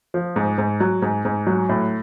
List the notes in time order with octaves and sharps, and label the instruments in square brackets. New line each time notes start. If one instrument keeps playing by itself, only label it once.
[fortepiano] F3
G#2
G#2
F#3
G#2
G#2
F#3
A2